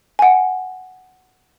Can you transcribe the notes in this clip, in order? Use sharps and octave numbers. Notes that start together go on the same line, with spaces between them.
F#5 G#5